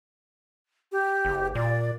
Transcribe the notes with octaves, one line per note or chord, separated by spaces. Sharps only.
G4
F#1
A#2 D5